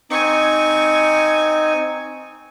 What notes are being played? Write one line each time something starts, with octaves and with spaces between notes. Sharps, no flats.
C4 D#4 G#5 C#6